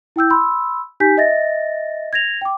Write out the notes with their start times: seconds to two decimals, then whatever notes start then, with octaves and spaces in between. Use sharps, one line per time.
0.16 E4 G5 E6 G6
0.30 B5 C6 E6
1.00 D#4 G4 G#5 G6 B6
1.17 D#5 E5 A6 A#6
2.13 G#6 A#6 F7
2.41 G5 D6